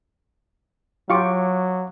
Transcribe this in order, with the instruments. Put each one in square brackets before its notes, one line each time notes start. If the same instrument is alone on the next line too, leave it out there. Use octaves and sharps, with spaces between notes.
[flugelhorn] F#3 [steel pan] F4 G4 [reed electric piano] F5 C#6 D6